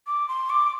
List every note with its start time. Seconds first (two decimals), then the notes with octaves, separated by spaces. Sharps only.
0.07 D6
0.28 C6
0.50 D6